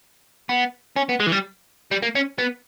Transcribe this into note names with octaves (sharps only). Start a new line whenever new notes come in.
B3
C#4
B3
G#3
E3
G3
G3
A#3
C#4
B3